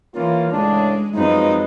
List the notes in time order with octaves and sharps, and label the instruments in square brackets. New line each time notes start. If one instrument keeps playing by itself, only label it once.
[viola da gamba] E3 [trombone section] A#3 C#4 F4
[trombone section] C#2 A2 D4 [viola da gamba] G#3
[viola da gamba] F#2 C4 B4 [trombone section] F3 G#3 D#4